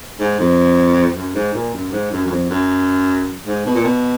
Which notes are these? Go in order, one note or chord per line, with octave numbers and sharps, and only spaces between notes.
G#2
F2
F#2
G#2
A#2
F#2
G#2
F#2
F#2
F2
F#2
G#2
B2
A#2
B2